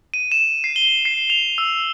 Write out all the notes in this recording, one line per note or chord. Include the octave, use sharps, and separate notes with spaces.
D#7
E7
C7
G7
C7
F7
E6